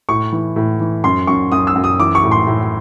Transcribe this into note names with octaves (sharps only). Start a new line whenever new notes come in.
A2 C#6
E3
A2
E3
F#2 C6
F#2 C#6
F#2 D#6
E6
F#2
D#6
E3 D6
C#6
A2
C6
A2